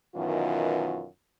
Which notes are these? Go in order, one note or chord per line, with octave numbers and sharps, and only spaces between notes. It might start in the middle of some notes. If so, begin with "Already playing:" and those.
F#2 B2 D#3 E3 F4